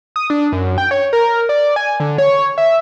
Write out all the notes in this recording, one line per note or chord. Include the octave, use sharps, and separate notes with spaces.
D#6
D4
F#2
G5
C#5
A#4
D5
G#5
D3
C#5
E5